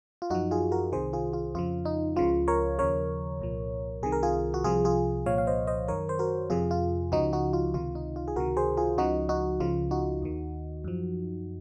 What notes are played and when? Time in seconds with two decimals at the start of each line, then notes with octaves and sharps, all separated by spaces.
0.22 F4
0.30 F#2 F3 D#4 F#4
0.51 F4 G#4
0.72 F#4 A#4
0.92 C2 C3 D#3 G#4 C5
1.13 F4 G#4
1.33 F4
1.55 F2 C#3 F3 F4
1.85 D#4
2.16 C#2 C#3 F3 F4
2.48 A#4 C#5
2.79 D#2 C#3 F3 A#4 C#5
3.41 C2 A#2 F3
4.03 C2 C3 D#3 G#4
4.12 A#4
4.23 F4 G#4
4.54 F#4
4.64 C2 C3 F3 F4 G#4
4.85 F4 G#4
5.26 C2 A#2 F3 C#5 F5
5.38 F5
5.47 C5 D#5
5.67 C5 D#5
5.88 F#2 D#3 A#4 C#5
6.09 C5
6.19 F#4 A#4
6.50 F2 C3 F3 F4 G#4
6.71 F4
7.12 C#2 C#3 F3 D#4 F#4
7.33 D#4 F#4
7.53 F4
7.74 C#2 C3 D#3 F4
7.95 D#4
8.16 F4
8.28 G#4
8.36 C#2 C3 D#3 F#4 A#4
8.57 G#4 C5
8.77 F4 G#4
8.98 C#2 C#3 F3 D#4 F#4
9.29 D#4 F#4
9.60 C#2 C#3 F3 F4
9.91 D#4 F#4
10.22 D#2 D#3
10.84 F#2 F3